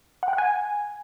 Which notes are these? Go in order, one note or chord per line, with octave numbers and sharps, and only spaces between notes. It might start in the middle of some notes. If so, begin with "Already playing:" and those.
F#5
G5
F#5
G#5